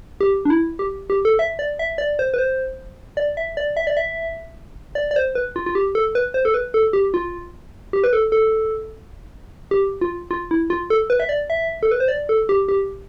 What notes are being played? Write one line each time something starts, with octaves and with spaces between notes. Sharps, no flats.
G4
D4
E4
G4
G4
A4
E5
D5
E5
D5
C5
B4
C5
D5
E5
D5
E5
D5
E5
D5
D5
C5
B4
F4
F4
G4
A4
B4
C5
A4
B4
A4
G4
F4
G4
B4
A4
A4
G4
F4
F4
E4
F4
A4
B4
E5
D5
E5
A4
B4
C5
D5
A4
G4
G4